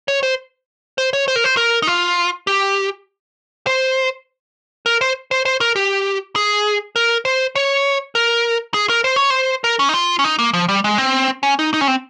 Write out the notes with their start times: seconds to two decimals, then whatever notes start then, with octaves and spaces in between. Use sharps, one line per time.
0.08 C#5
0.23 C5
0.98 C5
1.13 C#5
1.28 C5
1.36 A#4
1.44 C5
1.57 A#4
1.82 D#4
1.87 F4
2.47 G4
3.67 C5
4.86 A#4
5.01 C5
5.31 C5
5.45 C5
5.61 A#4
5.76 G4
6.36 G#4
6.96 A#4
7.25 C5
7.56 C#5
8.15 A#4
8.74 G#4
8.89 A#4
9.04 C5
9.16 C#5
9.30 C5
9.64 A#4
9.79 C#4
9.89 D#4
9.94 F4
10.19 C#4
10.24 D#4
10.39 A#3
10.53 F3
10.69 G3
10.84 G#3
10.98 C4
11.43 C#4
11.59 D#4
11.74 D#4
11.81 C#4
11.88 C4